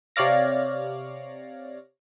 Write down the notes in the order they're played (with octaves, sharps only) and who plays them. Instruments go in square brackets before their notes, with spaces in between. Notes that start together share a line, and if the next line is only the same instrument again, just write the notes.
[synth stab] C3 C#5 D5 F5 A#6